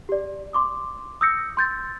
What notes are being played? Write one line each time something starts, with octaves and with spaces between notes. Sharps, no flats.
G4 D5
C6 D6 D#6
D#6 E6 G6 A#6 C#7
C6 G6 A6